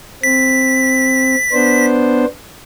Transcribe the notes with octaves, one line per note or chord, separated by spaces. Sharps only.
C4 B6
B3 D4 C5